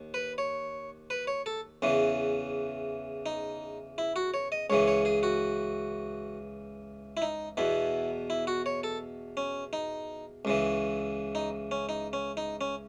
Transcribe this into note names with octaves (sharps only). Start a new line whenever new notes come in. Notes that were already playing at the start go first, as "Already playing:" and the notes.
Already playing: D#2
B4
C#5
B4
C#5
A4
E2 C#3 E3
D#4
E4
F#4
C#5
D#5
C#2 C#3 E3 C#5
C#5
G#4
F#4
E4
D#4
E2 B2 E4
E4
F#4
C#5
A4
C#4
D#4
C#2 C#3 E3
D#4
C#4
D#4
C#4
D#4
C#4